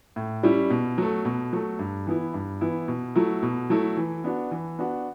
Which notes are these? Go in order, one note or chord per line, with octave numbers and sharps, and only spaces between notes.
A2
G3 C#4 E4
B2
F#3 A3
B2
F#3 A3
G2
E3 B3 E4
G2
E3 B3 E4
B2
F#3 A3 E4
B2
F#3 A3 E4
E3
B3 D4 F#4
E3
B3 D4 F#4